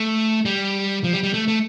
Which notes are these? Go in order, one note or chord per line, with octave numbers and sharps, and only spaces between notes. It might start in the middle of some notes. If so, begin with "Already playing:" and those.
Already playing: A3
G3
F3
G3
G3
A3
A3